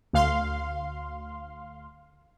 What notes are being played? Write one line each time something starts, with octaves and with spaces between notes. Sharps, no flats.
D2 F5 C6